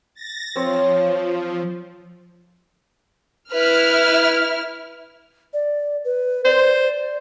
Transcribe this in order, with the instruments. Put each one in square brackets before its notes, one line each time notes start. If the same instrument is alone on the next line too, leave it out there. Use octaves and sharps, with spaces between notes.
[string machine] A6 A#6
[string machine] F3 [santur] C4 C#5
[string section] E4 F6 [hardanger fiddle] B4
[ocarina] D5
B4
[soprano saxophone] C5 [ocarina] D5